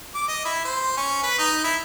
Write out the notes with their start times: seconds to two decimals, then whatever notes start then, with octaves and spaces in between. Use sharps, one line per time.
0.15 D6
0.28 D#5
0.45 E4
0.65 C5
0.97 C#4
1.23 B4
1.39 D#4
1.64 E4